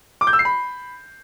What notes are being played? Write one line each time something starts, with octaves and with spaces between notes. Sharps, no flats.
D6
G6
E6
C7
B5